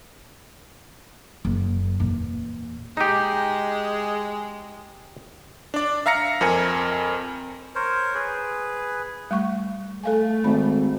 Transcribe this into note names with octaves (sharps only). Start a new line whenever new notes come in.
F#1
E2 A#2
G#3 D#4 G4
D4 D5
E5 F5 A#5 A#6 C#7
F2 C4 A#4 G#5
A#4 C5 C#5
G#4 B4
G3 A3 C#6
A3 A4 F5 G#5
G#1 B5